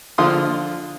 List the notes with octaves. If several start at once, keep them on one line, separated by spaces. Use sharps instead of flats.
D3 F3 F4 C6 D#6